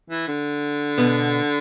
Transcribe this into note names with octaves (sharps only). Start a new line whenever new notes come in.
E3
D3
B2 B3